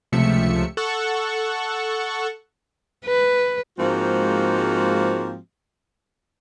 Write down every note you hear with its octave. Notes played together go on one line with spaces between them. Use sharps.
C#2 C3 F3 A3 E5 C#7
A4 F#5 C#6
B4
G#2 F3 G#3 A#3 C4 F#4